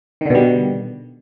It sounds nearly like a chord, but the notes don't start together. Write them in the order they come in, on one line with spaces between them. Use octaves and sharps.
D#3 D3 B2 G3